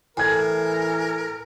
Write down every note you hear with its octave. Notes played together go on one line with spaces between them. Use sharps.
A2 E3 A#4 G#5 G#6